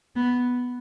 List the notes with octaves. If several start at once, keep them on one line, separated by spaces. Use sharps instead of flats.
B3